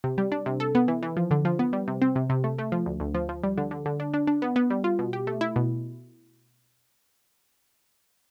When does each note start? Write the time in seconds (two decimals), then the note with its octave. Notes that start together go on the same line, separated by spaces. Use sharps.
0.04 C3
0.18 G3
0.32 D4
0.46 C3
0.60 A4
0.75 B3
0.88 E3
1.03 E3
1.17 F3
1.31 D3
1.45 F3
1.59 B3
1.73 G3
1.88 C3
2.02 C4
2.16 C3
2.30 C3
2.44 A3
2.59 A3
2.72 F3
2.86 D2
3.00 D2
3.15 F3
3.29 F3
3.44 G3
3.58 D3
3.71 D3
3.86 D3
4.00 D4
4.14 D4
4.27 D4
4.42 B3
4.56 B3
4.70 G3
4.84 F4
4.99 B2
5.13 G4
5.27 A3
5.41 E4
5.56 B2